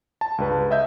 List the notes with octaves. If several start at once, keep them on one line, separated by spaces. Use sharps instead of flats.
A5
C#2 G2 B4
D#5 E5 G6